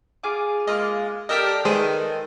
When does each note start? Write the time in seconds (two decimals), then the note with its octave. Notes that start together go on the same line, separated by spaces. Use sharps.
0.24 F4 G#4 D6
0.67 G#3 A#3 F4 D#5 D6
1.29 D4 G4 A4 A#4 D#5 E6 B6
1.65 D#3 G#3 G#4 A4 B4 C5 D#5